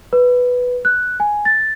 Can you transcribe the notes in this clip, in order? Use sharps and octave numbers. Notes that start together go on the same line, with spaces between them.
B4
F#6
G#5
A6